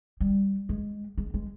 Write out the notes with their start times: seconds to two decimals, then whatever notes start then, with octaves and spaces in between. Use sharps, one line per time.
0.20 G3
0.69 G#3
1.18 G#3
1.34 G#3